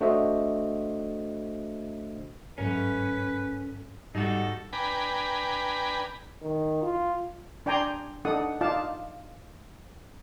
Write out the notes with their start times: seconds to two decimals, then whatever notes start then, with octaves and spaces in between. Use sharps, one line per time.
0.01 A3 D4 F#4 C5 D#5 E5
2.58 G1 G#2 F#3 A3 C#4 A#4 B4
4.15 G#2 G3 D#4 F#4 A4
4.73 D4 B4 G5 G#5 A#5 B5
6.42 D#3
6.82 F4
7.66 D4 D5 G5 G#5 A#5 C6
8.25 D4 D#4 A4 F#5 D#6
8.61 D#4 F4 D5 F5 A5